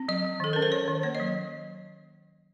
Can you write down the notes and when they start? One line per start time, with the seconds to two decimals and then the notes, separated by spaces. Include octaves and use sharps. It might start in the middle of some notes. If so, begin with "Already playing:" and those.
Already playing: C4
0.08 F#3 D#5
0.25 F#3
0.40 D#3 A4
0.53 C#4 A#4
0.62 C5
0.72 D#3 C#5
0.88 D#3
1.03 A#3 C#5
1.15 D#5
1.20 F#3